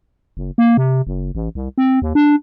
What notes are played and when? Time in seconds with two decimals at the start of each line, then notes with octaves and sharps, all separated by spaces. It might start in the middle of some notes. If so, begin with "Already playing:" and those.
0.37 F#1
0.58 A#3
0.77 C3
1.07 F#1
1.35 A1
1.55 C2
1.78 C4
2.02 D#2
2.15 D4